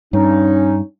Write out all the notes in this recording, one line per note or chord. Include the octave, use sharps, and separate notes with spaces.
G2 C#4 D#4